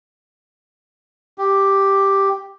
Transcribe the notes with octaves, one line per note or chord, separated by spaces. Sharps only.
G4